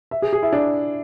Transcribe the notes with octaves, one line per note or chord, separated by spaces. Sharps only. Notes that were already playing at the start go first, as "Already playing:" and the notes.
E5
G#4
G#4
E4
D4